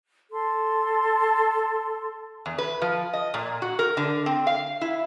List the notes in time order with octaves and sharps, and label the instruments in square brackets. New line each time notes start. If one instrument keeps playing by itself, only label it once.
[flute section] A4 C6
[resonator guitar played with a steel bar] E2
B4
F3
D#5
A#2
F#4
A#4
D3
C4
F5
E4